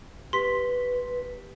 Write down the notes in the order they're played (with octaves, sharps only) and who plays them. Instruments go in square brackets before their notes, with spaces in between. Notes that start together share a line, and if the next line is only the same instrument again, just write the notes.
[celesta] G4 B6 [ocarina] B4 [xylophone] C6